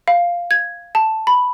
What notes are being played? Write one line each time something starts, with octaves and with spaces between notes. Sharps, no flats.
F5
G#6
A5
B5